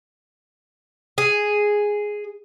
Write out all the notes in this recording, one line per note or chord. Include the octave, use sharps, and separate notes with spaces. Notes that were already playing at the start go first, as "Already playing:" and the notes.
G#4